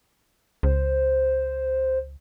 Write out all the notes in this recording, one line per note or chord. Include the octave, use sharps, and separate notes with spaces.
C#2 C5